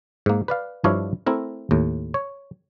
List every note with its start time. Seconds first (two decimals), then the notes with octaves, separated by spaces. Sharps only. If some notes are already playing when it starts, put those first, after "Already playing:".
0.26 G#2 A#3
0.48 B4 D5 F5
0.84 G2 F3 D4 E4 C#5 F5
1.26 A3 C4 E4 A#4
1.71 D#2 A2
2.14 C#5